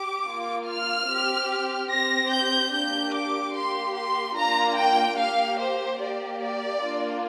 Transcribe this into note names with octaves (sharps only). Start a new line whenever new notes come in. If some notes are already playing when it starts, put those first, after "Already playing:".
Already playing: G4 D6
A#3 F4
F6
C4 G4
C4 G4 A#6
G6
A#3 D4 G4 G6
D6
A#3 G4 C6
C6
A#3 D4 F4 A#5
G5
A#3 G4 F5
C5
A#3 G4 D5
D5
A#3 D4 F4